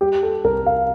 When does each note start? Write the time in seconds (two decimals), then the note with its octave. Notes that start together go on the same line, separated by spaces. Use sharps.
0.01 G3 G4
0.23 A4
0.44 C2 A#4
0.66 F5